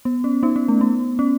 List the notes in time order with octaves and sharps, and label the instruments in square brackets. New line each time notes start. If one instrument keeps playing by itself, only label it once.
[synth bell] B3
C#4
B3 D#4
C#4
A3
B3
C#4